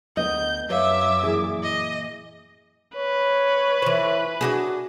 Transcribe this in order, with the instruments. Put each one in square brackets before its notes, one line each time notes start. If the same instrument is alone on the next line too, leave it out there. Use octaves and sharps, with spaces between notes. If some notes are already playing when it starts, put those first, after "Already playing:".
[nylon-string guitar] D2 B3 D#5 [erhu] G6
[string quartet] F#2 D6 [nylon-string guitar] B4 C#5 F5 [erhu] E5
[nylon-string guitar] A#2 E3 G#4
[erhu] D#5
[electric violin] B4 [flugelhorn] C#5
[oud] E3 C5
D4 F#4 G#4